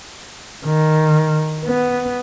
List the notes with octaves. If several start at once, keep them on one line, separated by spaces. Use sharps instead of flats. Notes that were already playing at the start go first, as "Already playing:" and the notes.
D#3
B3